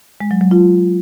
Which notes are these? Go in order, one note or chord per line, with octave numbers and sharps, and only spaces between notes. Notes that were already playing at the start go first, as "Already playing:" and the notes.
G#3
F#3
F#3
F4